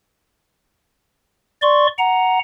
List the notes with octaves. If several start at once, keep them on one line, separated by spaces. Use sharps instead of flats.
D5 C6 C#6
F#5 A#5